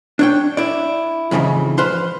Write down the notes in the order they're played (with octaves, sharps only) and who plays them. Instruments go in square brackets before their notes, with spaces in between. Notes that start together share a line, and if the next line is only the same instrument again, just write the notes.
[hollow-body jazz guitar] D4 C#5 G5
E4 D5
F2 G#2 C#3 E3 F3
B4 C5 F5 C6